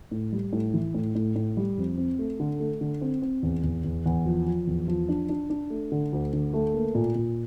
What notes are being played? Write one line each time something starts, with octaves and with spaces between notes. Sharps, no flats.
A2
G3
A2
E3
A2
A2
A2
G3
F2
C4
A3
D3
A3
D3
C4
C4
E2
E2
E2
E2
F3
F3
E2
F3
D4
D4
D4
A3
D3
D2
D3
A3
A#3
A#2
A#2